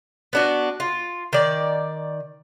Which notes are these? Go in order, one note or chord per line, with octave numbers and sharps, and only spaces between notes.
B3 D4 F#4
F4
D#3 D5